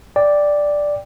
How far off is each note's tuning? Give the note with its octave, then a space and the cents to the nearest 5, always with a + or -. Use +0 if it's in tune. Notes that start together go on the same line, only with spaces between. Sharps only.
D5 +0 G5 +5